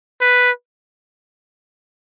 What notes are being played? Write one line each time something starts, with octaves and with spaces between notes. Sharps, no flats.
B4